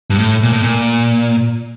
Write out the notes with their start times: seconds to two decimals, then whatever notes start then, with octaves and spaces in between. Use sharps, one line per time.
0.10 G2
0.18 A2
0.43 A#2
0.53 A2
0.63 A#2